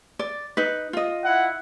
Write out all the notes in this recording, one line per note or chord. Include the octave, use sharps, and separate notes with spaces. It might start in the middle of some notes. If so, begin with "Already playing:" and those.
D5
D#4 B4
F4 D#5
E4 F#5